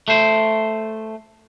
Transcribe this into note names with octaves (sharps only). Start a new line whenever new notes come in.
A3 C5